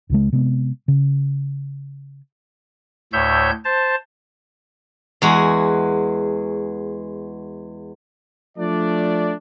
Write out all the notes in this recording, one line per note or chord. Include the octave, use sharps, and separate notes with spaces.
C#2 C#3 G#3
C3 G#3 B3
C#3
D2 A2 C#5 E5 G6
C5 A5
E2 G#3 F#4
F3 A3 D4 D5